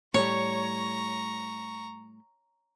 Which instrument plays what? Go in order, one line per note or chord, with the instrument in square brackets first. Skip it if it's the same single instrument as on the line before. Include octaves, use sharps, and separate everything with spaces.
[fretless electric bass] A2 G3 [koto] C#5 [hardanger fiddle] A#5 C#6